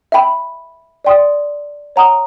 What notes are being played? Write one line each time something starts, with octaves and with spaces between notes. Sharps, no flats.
E5 G5 B5
D5 G5 C6 D#6
C#5 F#5 A#5 D#6